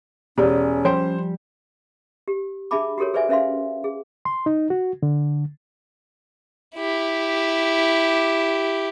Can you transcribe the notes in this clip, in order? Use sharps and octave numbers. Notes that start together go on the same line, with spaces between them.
E1 C#4 G4 D5 G#5
F3 G3 C5 G5
G4
D4 G#4 E5 A5 B5 D6
F#4 G4 A4 A#4 C#5
G#4 B4 C5 D5 E5 G#5
C#4 B4 E5 F5 C6
G#4
C6
D#4
F#4
D3
E4 G4